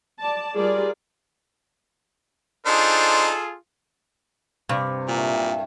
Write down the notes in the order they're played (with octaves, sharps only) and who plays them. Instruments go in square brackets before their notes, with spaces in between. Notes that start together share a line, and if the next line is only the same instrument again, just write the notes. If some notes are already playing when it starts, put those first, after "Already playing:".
[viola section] D5 A5
G3 F4 G#4 A#4 D5
[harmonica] D4 D#4 C5 [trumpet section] F4 G#4 A4
[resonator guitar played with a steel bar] G2 [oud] C3
[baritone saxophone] A#2 [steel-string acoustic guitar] F#3 D4 E4